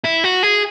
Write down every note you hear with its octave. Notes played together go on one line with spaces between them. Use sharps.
E4
F#4
G#4